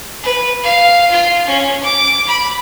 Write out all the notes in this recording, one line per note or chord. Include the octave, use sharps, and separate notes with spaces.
B4
F5
F4
C#4
D6
B5